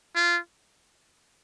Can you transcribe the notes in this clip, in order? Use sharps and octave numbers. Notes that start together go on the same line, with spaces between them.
F4